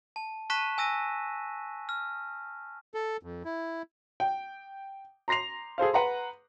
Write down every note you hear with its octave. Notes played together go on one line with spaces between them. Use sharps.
A5
A5 C#6 F#6 B6 D#7 E7
G#5 E6 A#6 D#7
F6
A4
F2
E4
G5
A#5 C6 A#6 C7 F7
G#4 A4 C5 F5
B4 F#5 A#5 C6